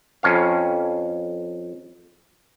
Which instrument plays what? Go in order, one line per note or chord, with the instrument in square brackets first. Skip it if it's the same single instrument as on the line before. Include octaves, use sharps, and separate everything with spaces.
[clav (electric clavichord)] F2 C#4 F5